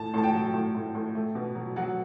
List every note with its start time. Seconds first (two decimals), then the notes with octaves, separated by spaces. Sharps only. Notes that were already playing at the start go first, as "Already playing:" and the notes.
Already playing: A2 A5
0.14 A2 A5
0.24 G5
0.33 F#3
0.54 A2
0.75 A2
0.95 A2
1.15 A3
1.35 B2
1.55 F#3
1.76 F#3 F#5